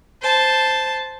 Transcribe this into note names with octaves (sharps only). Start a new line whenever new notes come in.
C5 A5